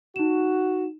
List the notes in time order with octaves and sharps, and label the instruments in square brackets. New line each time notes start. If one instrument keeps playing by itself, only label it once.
[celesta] D#4 E7 [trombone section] F#4